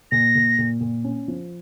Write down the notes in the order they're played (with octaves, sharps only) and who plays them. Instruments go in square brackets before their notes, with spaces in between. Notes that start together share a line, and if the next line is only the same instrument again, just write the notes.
[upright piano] A#2 [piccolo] A#6
[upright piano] A#2
A#2
A#2
C#4
F3